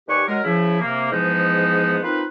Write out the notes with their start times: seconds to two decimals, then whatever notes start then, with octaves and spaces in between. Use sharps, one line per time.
0.08 D#2 G3 G4 B4 G#5 C#6
0.27 F#3 G#3 A#4
0.44 C#3 F3 E4
0.80 C3 A#3
1.11 E2 G#2 F3 G#3 B3 D#4
2.03 A#3 C4 D#4 F4 B4